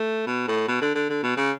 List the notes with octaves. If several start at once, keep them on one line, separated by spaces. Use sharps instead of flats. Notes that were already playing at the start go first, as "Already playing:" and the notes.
Already playing: A3
B2
A2
B2
D3
D3
D3
B2
C#3